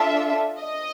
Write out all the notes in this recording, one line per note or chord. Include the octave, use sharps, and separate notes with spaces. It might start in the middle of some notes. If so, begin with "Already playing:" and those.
Already playing: D4 F4 A4 E5
D#5